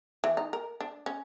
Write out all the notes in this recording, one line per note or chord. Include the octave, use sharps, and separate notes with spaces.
E3
D#4
A#4
D4
C#4